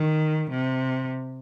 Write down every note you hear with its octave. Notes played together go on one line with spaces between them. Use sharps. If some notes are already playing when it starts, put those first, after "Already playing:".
Already playing: D#3
C3